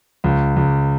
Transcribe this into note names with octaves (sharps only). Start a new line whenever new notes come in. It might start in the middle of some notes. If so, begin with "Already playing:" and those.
C#2
C#2